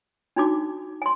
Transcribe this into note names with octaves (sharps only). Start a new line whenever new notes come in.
D4 D#4 F#4 D6
G#5 C6